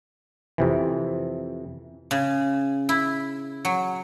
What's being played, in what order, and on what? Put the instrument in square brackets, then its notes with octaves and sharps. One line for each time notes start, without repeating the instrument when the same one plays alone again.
[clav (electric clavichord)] F2 C3 E3
[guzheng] C#3
E4
F#3